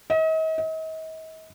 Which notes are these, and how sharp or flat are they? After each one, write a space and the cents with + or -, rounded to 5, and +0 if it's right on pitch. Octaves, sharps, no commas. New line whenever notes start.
D#5 +40
D#5 +40